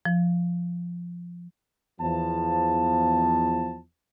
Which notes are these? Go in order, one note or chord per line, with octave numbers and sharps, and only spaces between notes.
F3
E2 F3 A5